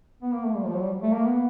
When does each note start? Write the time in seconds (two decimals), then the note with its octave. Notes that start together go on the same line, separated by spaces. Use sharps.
0.22 B3
0.33 A#3
0.45 A3
0.56 G3
0.65 F3
0.74 F#3
0.82 G3
1.02 A3
1.14 A#3
1.26 B3